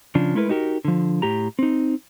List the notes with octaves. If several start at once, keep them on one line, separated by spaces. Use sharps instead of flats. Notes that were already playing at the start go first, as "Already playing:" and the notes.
C#3 F3 D4
G#3 A3 E4 A#4 B4
D#4 F#4 G4 A#4
D3 F3
A2 G4 A#5
C4 D#4